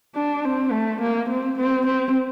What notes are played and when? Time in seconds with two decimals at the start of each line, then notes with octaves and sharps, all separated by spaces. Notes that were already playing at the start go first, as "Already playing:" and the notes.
0.15 D4
0.44 C4
0.72 A3
1.01 A#3
1.29 C4
1.58 C4
1.87 C4